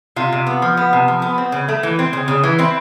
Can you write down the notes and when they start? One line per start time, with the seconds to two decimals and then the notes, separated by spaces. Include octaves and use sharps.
0.16 C3 F4
0.32 C3
0.47 B3
0.62 F3
0.77 B3
0.93 C3
1.08 F3
1.22 B3
1.38 C4
1.52 C#3
1.69 A3
1.83 E3
1.99 C4
2.13 C#3
2.28 C#3
2.43 E3
2.59 C4 E4